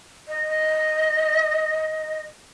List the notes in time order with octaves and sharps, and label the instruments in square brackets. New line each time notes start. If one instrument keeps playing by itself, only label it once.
[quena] D#5